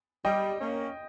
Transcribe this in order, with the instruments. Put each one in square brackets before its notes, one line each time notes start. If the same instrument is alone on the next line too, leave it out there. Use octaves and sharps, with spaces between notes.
[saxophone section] G3 [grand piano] D#5 G5
[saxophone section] A#3 C#4